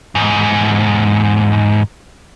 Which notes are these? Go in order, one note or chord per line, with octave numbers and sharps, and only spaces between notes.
E2 G#2